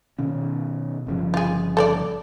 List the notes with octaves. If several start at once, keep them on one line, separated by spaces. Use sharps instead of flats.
B2 D#3 C#4
G1 C#3 F3
F4 G#4
A4 C#5 D5